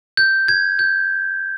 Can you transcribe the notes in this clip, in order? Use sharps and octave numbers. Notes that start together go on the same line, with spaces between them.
G6
G#6
G6